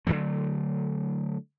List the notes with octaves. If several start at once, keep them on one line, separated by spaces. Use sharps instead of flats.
D3 E3 F#3 A3